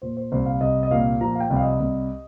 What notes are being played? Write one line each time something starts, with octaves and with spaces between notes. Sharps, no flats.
A#2 C5
C5
C2 C5
F5
C2 D#5
D#5
A#2 F5
F3 A#5
F5
G5
C2
F5
D#5
C2